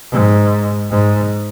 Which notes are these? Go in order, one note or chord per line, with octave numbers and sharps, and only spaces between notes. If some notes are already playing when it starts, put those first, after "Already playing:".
G#2
G#2